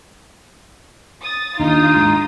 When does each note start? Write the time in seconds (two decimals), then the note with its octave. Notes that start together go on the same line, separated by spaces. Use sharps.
1.22 D#6 A6
1.59 D#2 D4 D#4 F4 D#6
1.96 G#2